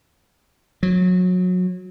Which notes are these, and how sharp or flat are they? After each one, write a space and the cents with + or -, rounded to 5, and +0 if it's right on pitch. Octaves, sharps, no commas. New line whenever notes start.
F#3 -25